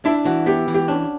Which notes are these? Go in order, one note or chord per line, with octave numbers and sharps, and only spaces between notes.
D4 E4
E3 F#4
B3 G4
E3
G4
C#4 D4